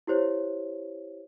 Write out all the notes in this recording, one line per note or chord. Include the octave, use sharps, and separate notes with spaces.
E4 G4 C5 C#5